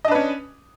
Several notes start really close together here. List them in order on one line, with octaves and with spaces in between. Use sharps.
D#5 D4 B4 C#4